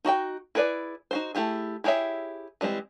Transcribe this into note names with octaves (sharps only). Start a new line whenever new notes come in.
D#4 F#4 E5 G5
E4 G#4 B4 C#5 D5
D#4 F#4 C5
A3 E4 G4 G#4
E4 G4 G#4 C#5 E5
E3 G3 G#3 C4